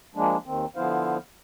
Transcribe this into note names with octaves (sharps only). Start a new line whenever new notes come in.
F3 G#3 A#3 D4
D#2 D#3 C4
D3 F3 B3 E4 C5 F5